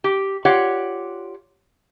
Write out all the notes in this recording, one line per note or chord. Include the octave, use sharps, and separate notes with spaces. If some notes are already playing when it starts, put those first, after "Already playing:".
G4
F4 G4 C#5 D5 F#5